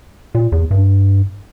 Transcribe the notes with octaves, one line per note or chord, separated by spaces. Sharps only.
A#2
E2
G2